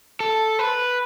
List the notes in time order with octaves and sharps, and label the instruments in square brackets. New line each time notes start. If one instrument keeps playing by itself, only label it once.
[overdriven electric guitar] A4
B4